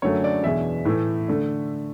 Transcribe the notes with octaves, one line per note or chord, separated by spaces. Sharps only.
F#2 D3 F#3 A3 C#5
D5
E2 B2 G#3 D4 E5
A2 E3 A3
D3 A3 D4